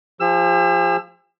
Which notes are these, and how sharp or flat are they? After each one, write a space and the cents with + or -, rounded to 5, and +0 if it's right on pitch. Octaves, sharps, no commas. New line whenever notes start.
F3 +0 G#4 -45 E6 +25